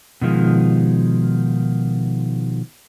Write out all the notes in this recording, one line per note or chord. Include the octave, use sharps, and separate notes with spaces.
B2 D#3 F3 G#3